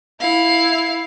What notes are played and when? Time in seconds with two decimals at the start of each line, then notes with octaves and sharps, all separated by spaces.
0.21 E4 F5